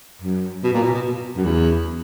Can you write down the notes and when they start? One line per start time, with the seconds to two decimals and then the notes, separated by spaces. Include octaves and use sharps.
0.22 F#2
0.63 B2
0.73 A#2
0.83 B2
0.93 B2
1.36 F#2
1.44 E2